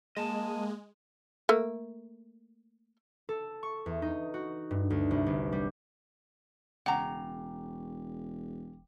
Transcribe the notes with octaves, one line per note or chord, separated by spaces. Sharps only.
G#3 A#3 D#5 A5
A3 A#3
A4
C#6
E2
D#4
F#4
G2
D2
C2
G1
G3
E1 C#3 F#5 G5 A#5 D6